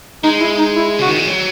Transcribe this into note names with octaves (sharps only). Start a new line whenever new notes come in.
G#3 D#4
E4
D#4
E4
C#3 F#4
D#3
E3
F#3